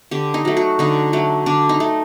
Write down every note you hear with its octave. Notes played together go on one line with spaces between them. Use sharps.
D3 G4
D#4
F#3 A3
F#4
D3 D#4
F#3 A3
D3 D4
D#4
A3